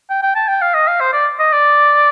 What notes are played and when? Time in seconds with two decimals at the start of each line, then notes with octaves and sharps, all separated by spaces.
0.10 G5
0.23 G5
0.35 A5
0.48 G5
0.62 F5
0.74 D#5
0.88 F5
1.00 C5
1.13 D5
1.39 D#5
1.53 D5